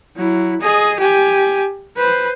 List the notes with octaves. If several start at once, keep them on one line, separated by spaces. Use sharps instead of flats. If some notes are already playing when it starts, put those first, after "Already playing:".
F#3 E4
G#4 D#5
G4 G#5
B4 C5